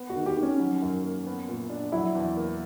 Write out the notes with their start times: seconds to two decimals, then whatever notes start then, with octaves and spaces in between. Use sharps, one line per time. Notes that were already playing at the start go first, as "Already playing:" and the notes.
Already playing: B3
0.10 F#4
0.16 D#3
0.26 G4
0.37 D#3
0.43 C#4
0.60 F#3
0.82 F#2
1.04 A#3
1.26 B3
1.49 A#2
1.70 D4
1.92 F#3 E4
2.15 E2
2.37 A#3